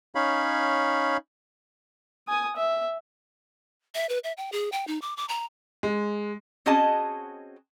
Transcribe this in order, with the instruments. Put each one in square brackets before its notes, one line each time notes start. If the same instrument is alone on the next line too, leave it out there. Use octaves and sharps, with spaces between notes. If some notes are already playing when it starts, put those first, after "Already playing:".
[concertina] C#4 D#4 C#5 F5 B5
[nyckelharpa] G#5 D#6
E5
[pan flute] E5
B4
E5
G5
G#4
G5
D#4
D6
D6
A#5
[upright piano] G#3
[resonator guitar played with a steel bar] C4 C#4 F#4 G#4 D#5 A5